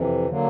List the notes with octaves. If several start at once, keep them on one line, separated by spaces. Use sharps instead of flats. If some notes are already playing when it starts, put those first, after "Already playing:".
Already playing: F2 C3 E3
D3 F#3 A#3